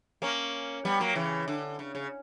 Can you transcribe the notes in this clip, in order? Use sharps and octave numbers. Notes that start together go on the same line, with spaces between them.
A#3 C#4
G3 B3
F#3 A#3
C#3 E3
D3
C#3
C#3